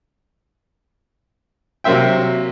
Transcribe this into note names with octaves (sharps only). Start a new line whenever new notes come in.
C3 F#3 A#3 C5 E5 G5